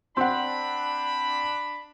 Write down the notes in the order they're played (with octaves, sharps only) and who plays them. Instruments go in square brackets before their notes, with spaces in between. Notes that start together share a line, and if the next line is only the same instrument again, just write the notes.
[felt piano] C4 F#5 [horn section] D4 B5